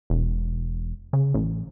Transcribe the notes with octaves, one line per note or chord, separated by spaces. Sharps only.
E1
C#3
A1